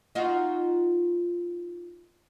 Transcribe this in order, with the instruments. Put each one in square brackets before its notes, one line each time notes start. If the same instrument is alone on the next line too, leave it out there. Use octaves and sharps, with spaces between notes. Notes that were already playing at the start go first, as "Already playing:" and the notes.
[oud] D#4 F4 F#4